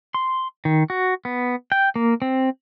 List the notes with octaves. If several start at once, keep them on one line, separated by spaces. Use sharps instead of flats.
C6
D#3
F#4
B3
G5
A#3
C4